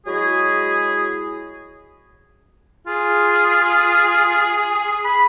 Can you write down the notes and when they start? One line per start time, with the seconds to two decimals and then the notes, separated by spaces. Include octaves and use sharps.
0.06 F#3 G#3 E4 F#4 G#4
2.87 F4 G#4
5.05 B5